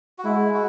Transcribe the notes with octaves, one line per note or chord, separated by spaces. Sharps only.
F#4
G#3 E4
F#4